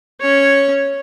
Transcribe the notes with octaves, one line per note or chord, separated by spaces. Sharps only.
C#4 C#5